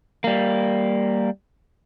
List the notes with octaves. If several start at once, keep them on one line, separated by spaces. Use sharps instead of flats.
G3 A#3